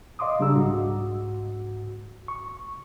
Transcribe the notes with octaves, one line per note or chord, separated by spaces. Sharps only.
D#5 F5 C6 D6 D#6
C#3 G3 D4 G#4 A#5 E6
C2 G#2 F#4
C#6